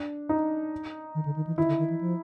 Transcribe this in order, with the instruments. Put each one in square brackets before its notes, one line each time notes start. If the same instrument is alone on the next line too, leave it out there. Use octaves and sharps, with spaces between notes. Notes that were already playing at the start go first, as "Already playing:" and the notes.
Already playing: [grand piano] D4
D#4
[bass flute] D#3
D3
D#3
E3
[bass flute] D#3 [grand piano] E4
[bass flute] D3
D#3
E3
F3